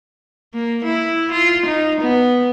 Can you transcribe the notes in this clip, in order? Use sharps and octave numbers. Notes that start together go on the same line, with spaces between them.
A#3
E4
F4
D#4
B3